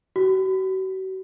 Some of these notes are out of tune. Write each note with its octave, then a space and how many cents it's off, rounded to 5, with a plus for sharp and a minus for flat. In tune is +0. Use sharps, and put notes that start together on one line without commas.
F#4 +40